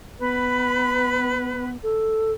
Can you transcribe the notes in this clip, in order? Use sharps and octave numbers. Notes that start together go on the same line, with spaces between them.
B3 B4 B5
A4